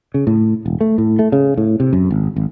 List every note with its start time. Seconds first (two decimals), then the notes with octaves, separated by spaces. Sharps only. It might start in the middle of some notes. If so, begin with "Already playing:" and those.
0.14 C#3
0.27 A2
0.66 E1
0.81 A3
0.98 A2
1.19 A3
1.32 C#3
1.57 A2
1.80 C3
1.93 F#2
2.11 G#1
2.36 G#1